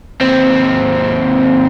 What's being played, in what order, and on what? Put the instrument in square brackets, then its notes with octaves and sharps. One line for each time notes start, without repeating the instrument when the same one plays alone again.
[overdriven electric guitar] D#2 C4